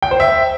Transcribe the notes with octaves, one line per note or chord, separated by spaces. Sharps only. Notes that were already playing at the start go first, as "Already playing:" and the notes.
G5
C5
E5